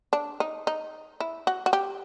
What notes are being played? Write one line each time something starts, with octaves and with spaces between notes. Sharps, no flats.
D4
D#4
D#4
E4
F#4
F#4
G4